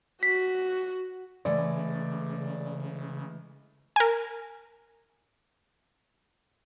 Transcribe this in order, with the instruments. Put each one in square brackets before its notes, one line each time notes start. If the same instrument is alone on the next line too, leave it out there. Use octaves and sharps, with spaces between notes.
[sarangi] F#4 [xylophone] B6
[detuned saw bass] C#3 [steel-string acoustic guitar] E3 G#3 A3 [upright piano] D5
[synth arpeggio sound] A#4 G#5